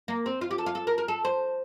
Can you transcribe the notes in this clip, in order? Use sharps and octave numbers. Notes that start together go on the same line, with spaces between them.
A#3
C4
F4
G4
A4
F4
A4
A#4
A#4
A4
C5